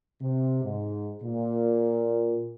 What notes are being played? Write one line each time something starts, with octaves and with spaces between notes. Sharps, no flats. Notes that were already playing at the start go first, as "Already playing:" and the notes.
C3
G#2
A#2